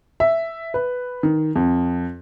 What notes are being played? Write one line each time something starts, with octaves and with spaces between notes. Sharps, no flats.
E5
B4
D#3
F2